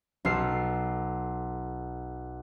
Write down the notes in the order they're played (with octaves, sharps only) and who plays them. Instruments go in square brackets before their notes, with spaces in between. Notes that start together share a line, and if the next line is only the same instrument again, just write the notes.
[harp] B1 A4 F6 C7